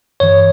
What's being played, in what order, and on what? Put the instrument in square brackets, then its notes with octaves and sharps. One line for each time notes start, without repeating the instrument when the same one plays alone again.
[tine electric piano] G2 E3 C#5